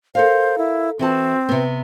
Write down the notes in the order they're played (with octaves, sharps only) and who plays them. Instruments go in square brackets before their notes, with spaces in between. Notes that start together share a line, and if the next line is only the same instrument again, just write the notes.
[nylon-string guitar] A4 A#4 F5 [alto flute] C5
[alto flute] E4
[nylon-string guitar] E3 F#4 A5 [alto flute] C4
[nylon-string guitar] C3 B3